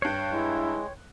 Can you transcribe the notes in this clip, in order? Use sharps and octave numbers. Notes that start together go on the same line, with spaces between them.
G2 C#5 G5 F#6 C7
G#3 E4